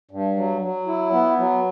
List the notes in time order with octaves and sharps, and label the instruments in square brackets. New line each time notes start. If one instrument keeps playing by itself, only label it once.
[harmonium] G2
F#3
F#3
E4
B3
F#3